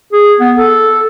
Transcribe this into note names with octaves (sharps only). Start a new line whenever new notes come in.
G#4
B3
A4